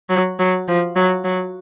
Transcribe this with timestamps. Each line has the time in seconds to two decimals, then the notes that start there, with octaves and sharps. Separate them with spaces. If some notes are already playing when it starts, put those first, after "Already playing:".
0.10 F#3
0.39 F#3
0.68 F3
0.96 F#3
1.24 F#3